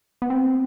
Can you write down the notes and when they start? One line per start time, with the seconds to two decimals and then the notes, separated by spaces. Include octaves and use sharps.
0.22 B3
0.30 C4